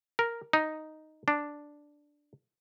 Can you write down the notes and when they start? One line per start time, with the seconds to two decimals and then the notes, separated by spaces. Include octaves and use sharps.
0.19 A#4
0.53 D#4
1.28 D4